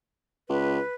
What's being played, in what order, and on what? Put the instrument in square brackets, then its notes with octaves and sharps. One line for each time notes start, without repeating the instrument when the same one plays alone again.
[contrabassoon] C#2 [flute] B4